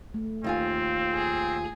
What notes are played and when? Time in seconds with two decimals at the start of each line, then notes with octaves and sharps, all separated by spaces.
0.14 A3
0.44 D#2 C4 F4 G#5
1.14 G#4